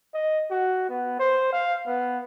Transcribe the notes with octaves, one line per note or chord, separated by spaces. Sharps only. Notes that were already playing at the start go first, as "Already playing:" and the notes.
D#5
F#4
B3
C5
F5
B3